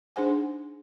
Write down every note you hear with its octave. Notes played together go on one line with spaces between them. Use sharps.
D4 D#4 G#4 C5 F#5 G#5